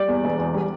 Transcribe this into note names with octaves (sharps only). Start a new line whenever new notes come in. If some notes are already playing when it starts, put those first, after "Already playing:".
Already playing: G3 D5
E2
E1
E2
G3